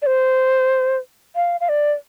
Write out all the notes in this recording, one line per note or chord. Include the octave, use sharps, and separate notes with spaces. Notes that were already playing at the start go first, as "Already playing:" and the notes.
D5
C5
F5
F5
D5